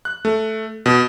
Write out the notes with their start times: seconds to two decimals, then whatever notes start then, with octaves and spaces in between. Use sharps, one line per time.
0.05 F#6
0.25 A3
0.86 B2